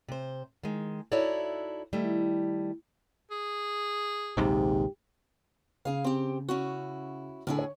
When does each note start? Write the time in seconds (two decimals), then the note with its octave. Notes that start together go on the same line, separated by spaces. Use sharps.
0.08 C3 C5
0.63 D#3 G#3
1.12 D#4 E4 F#4 A4 C#5 D5
1.93 D#3 G3 A3 E4
3.31 G#4
4.37 A#1 D#2 G#2 C3 G4
5.85 C#3 G#4 F5
6.04 C4 G4
6.48 C#4 E4 F#4
7.47 A2 D3 E4 G#4
7.59 C#5